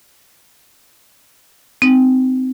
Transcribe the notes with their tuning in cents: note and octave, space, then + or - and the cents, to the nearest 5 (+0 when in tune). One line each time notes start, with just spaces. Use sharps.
C4 -20 D#4 -5